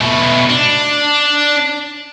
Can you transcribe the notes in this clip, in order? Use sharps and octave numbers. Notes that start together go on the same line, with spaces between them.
B2 A3
D4